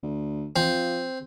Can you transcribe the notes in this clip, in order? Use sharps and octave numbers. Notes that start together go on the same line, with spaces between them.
D2
F3 C4